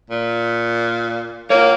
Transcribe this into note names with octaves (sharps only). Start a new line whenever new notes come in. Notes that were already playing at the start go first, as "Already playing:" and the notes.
A#2
A#3 F4 C#5